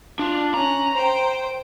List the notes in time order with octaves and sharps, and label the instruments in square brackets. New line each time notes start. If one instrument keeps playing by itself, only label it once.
[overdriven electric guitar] D4 [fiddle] F4
[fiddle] C#4 F#6 [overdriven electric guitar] A#5
[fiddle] C5 G5